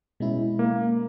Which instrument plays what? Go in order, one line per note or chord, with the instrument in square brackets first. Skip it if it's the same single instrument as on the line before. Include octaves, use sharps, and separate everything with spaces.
[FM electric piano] B2 G#3 C#4 E4
[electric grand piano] A#3